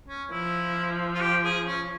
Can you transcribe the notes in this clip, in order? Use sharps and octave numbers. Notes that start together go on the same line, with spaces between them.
C#4
F3 E4
F4
G4
G#4
C#4